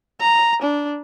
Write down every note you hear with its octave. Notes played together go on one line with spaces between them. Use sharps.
A#5
D4